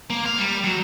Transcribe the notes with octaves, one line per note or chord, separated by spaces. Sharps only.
A#3
F5
G3
F#3